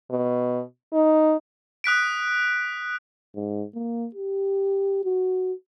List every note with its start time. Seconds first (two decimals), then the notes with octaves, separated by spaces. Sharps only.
0.10 B2
0.93 D#4
1.84 D#6 F#6 B6 D7
3.36 G#2
3.75 A#3
4.15 G4
5.04 F#4